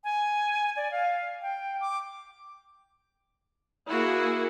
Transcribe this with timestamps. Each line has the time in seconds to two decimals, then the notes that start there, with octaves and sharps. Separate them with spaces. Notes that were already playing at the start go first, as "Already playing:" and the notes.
0.04 G#5
0.76 D5
0.91 F5
1.42 G5
1.81 D6
3.87 A#3 E4 F#4 G#4